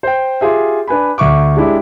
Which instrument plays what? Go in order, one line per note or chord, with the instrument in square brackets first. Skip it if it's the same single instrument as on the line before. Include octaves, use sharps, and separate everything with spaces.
[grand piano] C5 G5
F4 G4 G#4 E5
D4 B4 G#5 B5
D2 E5 C#6 D6
G#3 D4 E4 G4